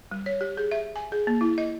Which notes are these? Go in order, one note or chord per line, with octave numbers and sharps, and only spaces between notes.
G3
C#5
G4
G#4
E5
G#5
G#4
A#3
E4
D#5